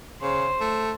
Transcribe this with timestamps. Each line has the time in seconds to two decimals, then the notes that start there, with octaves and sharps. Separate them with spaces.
0.22 C#3 C5
0.61 A3